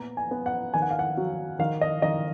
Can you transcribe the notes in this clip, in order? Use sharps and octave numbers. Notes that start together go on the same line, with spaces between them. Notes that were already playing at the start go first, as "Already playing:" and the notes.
Already playing: A#2 B3 A#5
G#5
B3
F#5
D#3 G#5
F#5
F5
F#5
F#3
D#3 F5
D#5
D#3 D#5